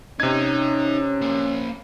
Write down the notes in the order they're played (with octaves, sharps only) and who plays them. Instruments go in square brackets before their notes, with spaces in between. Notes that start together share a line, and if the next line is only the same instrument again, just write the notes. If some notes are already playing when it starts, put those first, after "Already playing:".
[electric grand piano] C3 G#6 [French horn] C#4 [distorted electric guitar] D#4
[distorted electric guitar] A#3 C5